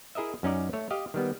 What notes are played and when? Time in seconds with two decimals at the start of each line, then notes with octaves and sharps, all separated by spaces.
0.15 E4 G#4 A#4 D#5 E5
0.43 F#2 C#4 D#4 D5
0.73 A3 C#5
0.91 G4 D#5 F5
1.14 D#3 G3 B3